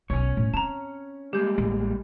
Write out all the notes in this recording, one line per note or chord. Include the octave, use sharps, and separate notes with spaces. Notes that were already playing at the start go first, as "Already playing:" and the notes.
B1 B3 C#4 C#5 C#6
A2
C4 A5 A#5
G3 G#3 A#3 G4 G6
A1